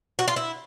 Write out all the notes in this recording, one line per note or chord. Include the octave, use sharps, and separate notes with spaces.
F#4
F4
E4